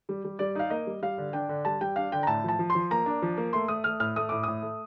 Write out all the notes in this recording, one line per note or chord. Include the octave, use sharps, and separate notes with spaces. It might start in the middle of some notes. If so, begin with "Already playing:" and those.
G3
G3
G3 D5
D#4 F5
A#3 D#5
G3
G3 F5
D3
D4 G5
D3
G3 A5
G3 G5
D4 F5
D3 G5
A#5
A2 A5
F3 A5
F3
C6
F3
A#3 A#5
D4
F3
A#3
A3 C6
A3 D#6
A3 F6
A2 F6
A3 D#6
A2 D6
A2 D#6
A3